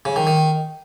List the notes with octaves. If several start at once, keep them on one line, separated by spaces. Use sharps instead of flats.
C#3
D#3
D#3